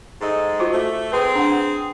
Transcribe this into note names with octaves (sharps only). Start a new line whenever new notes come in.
G#2 A4 D#5
F4 F#4 C5
A3
C4 G#4 B4
D4 F#5